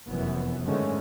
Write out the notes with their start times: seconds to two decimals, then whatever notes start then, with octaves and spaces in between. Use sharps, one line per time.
0.10 F1 F#2 E3 B3
0.65 G#2 D3 D#3 G#3 A3 C#4